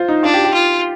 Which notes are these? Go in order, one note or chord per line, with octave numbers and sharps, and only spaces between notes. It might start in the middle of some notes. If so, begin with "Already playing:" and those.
Already playing: F4 C5
D#4
D4 F4
G4
G4
F4